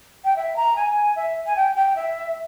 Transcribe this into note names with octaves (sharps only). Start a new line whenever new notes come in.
G5
E5
A#5
G#5
E5
G#5
G5
G5
E5